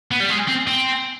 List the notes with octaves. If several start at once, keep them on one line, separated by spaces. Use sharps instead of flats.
B3
G3
G#3
C4
C4